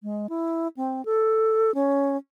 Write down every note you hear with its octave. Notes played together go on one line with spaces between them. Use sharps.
G#3
E4
C4
A4
C#4